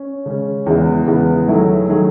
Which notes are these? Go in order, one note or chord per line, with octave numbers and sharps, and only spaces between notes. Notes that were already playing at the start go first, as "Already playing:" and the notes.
Already playing: C#4
C#3 G#3 C#4
E2 C#3 G#3 B3 E4
E2 C#3 G#3 B3 E4
D#3 F#3 A3 E4 G#4
D#3 F#3 A3 E4 G#4